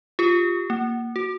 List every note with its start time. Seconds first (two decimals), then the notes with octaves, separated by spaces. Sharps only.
0.19 F4 G4
0.70 A#3
1.16 F#4